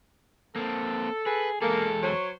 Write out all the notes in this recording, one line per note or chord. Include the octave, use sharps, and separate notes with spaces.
A#3 C4 A4
G#4 B4
E2 G#3 A#3 G#4 A4
F#3 C5 C#5